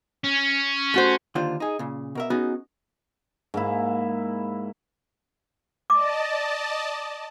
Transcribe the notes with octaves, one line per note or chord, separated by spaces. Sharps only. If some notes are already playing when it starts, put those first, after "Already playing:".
C#4
A3 F#4 C5
D#2 D3 D4 F4 C5
D#4 G#4
A#2 C#3
B2 A#4 E5
B3 C#4 D#4 F#4 G#4
G#2 A#3 E4
D5 D#5 A5 D6